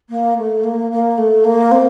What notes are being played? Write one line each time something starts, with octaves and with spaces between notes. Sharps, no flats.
A#3
A3
A#3
A#3
A3
A#3
C4